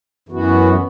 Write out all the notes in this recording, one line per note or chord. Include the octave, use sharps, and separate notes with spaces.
F#2 E3 B3 F#4